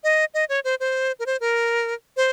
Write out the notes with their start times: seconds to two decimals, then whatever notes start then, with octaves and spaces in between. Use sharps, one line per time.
0.04 D#5
0.34 D#5
0.49 C#5
0.64 C5
0.80 C5
1.20 A#4
1.26 C5
1.40 A#4
2.17 C5